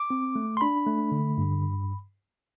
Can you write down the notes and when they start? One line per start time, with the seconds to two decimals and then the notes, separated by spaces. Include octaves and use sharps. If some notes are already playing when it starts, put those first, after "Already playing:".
Already playing: D6
0.10 C4
0.36 A3
0.57 C6
0.61 D4 B5
0.87 A3
1.12 D3
1.38 G2